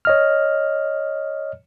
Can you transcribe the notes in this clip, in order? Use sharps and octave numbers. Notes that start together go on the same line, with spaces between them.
C#5 D#5 F6